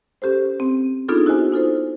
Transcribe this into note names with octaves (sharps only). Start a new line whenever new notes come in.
C#4 G4 A4 C5
C4
B3 D4 D#4 F4 G#4 A4
E4 F#4 C5 D#5 G#5
D#4 F4 A4 C5